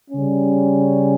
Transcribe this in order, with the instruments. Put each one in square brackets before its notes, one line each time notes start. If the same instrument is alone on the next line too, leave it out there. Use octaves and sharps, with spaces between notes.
[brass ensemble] C#3 G3 C#4